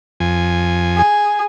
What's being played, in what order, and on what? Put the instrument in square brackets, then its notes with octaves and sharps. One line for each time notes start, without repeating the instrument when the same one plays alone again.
[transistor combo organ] F2 G#5
[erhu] G#4